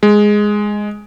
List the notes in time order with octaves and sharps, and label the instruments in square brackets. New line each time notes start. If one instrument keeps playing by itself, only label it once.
[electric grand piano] G#3